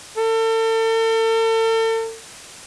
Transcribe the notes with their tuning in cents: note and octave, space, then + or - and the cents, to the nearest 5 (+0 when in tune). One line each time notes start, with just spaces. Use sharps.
A4 +40